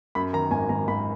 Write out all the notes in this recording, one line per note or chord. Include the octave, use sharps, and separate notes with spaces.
F#2 B5
D#3 A#5
G#1 G#5
G#1 A#5
G#1 B5